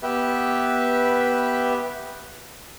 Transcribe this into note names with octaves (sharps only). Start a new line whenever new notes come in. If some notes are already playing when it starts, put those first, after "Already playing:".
B3 G4 B4 E5